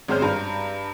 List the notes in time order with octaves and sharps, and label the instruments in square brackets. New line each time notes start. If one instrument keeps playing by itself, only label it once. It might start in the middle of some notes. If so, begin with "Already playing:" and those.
[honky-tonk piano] G#1 G#3 C#4 C5 F6 G6
G2 A#5